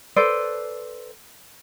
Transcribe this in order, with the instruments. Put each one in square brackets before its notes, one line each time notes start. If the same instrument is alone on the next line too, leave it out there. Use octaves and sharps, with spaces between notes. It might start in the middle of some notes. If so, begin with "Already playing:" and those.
[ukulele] A4 B4 C5 D5